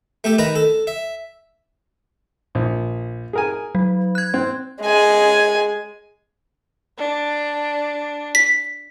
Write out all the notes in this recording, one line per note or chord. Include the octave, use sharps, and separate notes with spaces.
A3 G4 A4
D#3 B4 A#5 D#6
A4
E5
A#1
G#4 A#4 G#5
F#3
F#6 G#6
C4
G#3 G#5
D4
B6